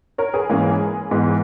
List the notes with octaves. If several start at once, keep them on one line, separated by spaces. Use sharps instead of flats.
A#4 C#5
G#4 B4
G#2 E3 A#3 C#4
G#2 E3 B3